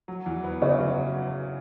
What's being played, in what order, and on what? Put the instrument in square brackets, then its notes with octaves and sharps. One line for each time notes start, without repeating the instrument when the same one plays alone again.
[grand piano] F#3
E2
B3
[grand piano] C#3 [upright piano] C#5 E5
[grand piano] F#3